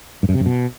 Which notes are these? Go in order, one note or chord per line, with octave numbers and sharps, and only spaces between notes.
G2
F#2
C3
F#2
B2